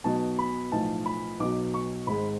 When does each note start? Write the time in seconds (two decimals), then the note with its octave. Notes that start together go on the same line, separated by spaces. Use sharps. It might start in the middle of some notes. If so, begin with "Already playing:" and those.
0.04 B1 B2 F#3 A5
0.39 B5
0.72 B1 A2 F3 A5
1.06 B5
1.40 B1 B2 F#3 D6
1.74 C#6
2.07 G#1 G#2 G#3 B5